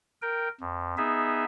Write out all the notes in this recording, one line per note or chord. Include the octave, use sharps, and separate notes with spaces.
A#4 G5
F2
B3 D#4 G#4 E5